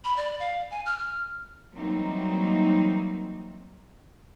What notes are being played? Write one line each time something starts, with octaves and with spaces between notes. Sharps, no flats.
B5
D5
F5
G#5
F6
F6
E3 F#3 G3 A#3 C4 D#4